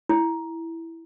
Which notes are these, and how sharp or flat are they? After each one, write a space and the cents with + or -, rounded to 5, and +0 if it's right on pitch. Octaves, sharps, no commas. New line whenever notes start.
E4 +0